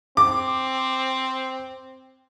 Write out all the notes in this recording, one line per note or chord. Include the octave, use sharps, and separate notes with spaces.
C4 D6